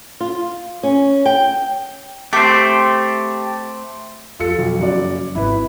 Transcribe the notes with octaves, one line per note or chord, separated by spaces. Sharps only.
F4
C#4
G5
A3 C4 G4
F2 F4 A4 C#7
B1
F#1 F#4 D5
G#1 E4 B4